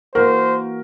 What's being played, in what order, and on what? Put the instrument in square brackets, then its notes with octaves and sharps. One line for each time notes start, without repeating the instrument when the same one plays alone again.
[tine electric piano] E3 A#3 F#4 [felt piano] A#4 [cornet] C5